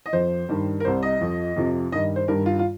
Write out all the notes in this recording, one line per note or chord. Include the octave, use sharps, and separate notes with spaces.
D#5
F2 F3 C5
G2 D#3 G3
A#4
C2 C3 G3 C5
D#5
F2 F3
F2 C3 F3
G2 D#3 G3 D#5
C5
G2 D#3 G3 A#4
F4
F4